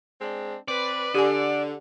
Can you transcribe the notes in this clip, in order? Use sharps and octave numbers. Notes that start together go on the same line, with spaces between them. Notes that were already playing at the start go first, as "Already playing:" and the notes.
G#3 C4 D4
C4 B4 D5
D3 G4 G#5